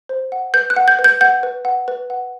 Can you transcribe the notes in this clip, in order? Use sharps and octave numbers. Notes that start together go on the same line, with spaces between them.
C5
F#5
B4 G6
F#6
F#5
G6
B4
G6
F#5 G6
B4
F#5
B4
F#5